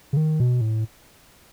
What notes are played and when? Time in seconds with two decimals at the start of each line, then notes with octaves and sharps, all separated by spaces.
0.13 C#3
0.17 D#3
0.40 B2
0.61 A2